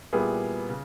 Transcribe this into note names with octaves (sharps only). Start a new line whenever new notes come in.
A#2 G3 B3 E4 G#4
C#3